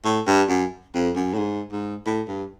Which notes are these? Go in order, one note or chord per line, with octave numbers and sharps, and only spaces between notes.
A2
G2
F#2
F2
F#2
A2
G#2
G#2
A2
G2